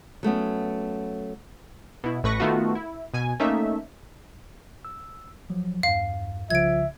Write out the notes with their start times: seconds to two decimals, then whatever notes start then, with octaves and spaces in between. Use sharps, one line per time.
0.23 F#3 A3 B3 C#4
2.04 B2 E4
2.23 A1 A2 B4 C#6 A#6
2.40 D#3 A3 B3 F4 F#4
2.75 E4
3.14 B2 G#5
3.40 A3 A#3 C#4 D#4 E5
4.85 E6
5.50 F3 F#3
5.83 E2 G2 F5
6.50 C2 C#3 F3 E5 G#6 D7